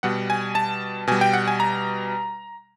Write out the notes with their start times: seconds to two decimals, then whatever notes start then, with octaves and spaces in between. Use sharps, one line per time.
0.03 B2 G3 F#5
0.30 G#5
0.55 A5
1.07 B2 G3 G#5
1.21 G5
1.33 F#5
1.47 G#5
1.60 A#5